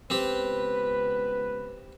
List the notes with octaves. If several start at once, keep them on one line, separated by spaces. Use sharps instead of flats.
C#2 B3 C4 G4 B4